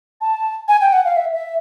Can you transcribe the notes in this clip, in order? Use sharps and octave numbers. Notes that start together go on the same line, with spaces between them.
A5
G#5
G5
F#5
F5
E5
E5